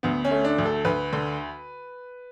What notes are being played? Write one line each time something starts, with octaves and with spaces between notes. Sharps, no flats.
D2 B3
C#4
A3
D4
D2
A4
D2 B4
D3